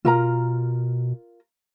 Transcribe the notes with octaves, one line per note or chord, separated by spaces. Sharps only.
B2 F4 A#4 A#5